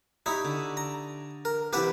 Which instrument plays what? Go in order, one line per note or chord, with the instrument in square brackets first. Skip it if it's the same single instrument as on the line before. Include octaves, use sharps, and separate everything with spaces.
[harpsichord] D#4 E4 [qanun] G4 C#5
[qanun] D3
[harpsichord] A#5
A#4
[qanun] C3 E3 E4 [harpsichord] G4 B4 F#5